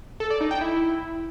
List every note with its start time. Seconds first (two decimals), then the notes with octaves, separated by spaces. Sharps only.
0.20 A4
0.30 D5
0.41 D#4
0.51 G5
0.61 E4